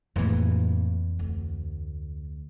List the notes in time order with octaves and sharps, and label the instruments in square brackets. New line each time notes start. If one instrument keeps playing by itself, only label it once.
[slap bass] F2 E3 [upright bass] A2 A#3
[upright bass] D2